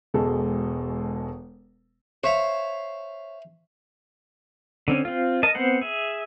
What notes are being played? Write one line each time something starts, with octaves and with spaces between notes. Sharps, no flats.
E1 B2 G#3 A4
C5 C#5 E5 F5
D3 C4 C#4
C4 F4
A#4 D#5 A5
B3 C4 C5 F#5
G#4 E5